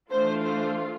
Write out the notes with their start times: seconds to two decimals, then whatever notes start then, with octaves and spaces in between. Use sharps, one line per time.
0.11 E3 A3 D4 F4 C5
0.43 C5